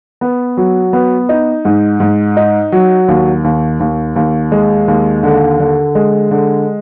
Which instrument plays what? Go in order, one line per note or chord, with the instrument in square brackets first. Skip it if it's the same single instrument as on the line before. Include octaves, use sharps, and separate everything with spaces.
[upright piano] B3
F#3
B3
D#4
G#2
G#2
D#4
F#3
D#2
D#2
D#2
D#2
G#3
D#2
D3
D3
G#3
D3